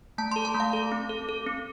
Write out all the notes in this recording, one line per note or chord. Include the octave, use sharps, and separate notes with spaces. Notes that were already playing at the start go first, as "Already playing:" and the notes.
A3 A5
C6
A4
A5
A3
F5
A4
C4
A4
A4
C4